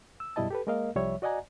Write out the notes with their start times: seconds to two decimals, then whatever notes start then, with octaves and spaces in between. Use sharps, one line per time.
0.20 E6
0.36 F#2 B2 G3 E4 D#5 A5
0.51 G4 A4 B4
0.67 G#3 A#3 A#4 D#5 F5
0.96 C2 F3 G3 C#5 E5
1.22 F#4 D5 D#5 F#5 G#5 A#5